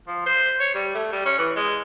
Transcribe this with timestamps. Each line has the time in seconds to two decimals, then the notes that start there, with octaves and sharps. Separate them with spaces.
0.07 F3
0.26 C5
0.60 C#5
0.74 G3
0.95 A3
1.12 G3
1.25 C#4
1.39 E3
1.56 G#3